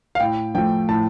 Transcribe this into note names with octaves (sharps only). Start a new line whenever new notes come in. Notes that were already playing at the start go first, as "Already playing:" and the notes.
F5
A2 G5
F3 A3 G5
A2 A5